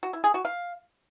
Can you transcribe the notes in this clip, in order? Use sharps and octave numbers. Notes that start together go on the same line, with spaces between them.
F#4
E4
G#4
F#4
F5